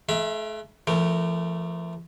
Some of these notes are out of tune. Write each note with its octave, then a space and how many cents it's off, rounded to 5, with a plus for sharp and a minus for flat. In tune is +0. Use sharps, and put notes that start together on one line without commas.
A3 -40 E5 +30 B5 -40
F3 -45 A3 +0 A#4 -15